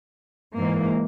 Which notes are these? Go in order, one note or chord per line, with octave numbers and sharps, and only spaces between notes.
G#2 E3 A#3